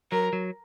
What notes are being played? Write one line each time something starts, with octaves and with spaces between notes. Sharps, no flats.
F#3 A#4
F#3